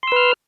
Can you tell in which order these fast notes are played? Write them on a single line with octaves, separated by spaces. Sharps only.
C6 E6 B4 F6